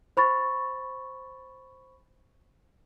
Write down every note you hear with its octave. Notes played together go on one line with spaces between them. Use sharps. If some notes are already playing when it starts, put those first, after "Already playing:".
C5 B5 C#6 A6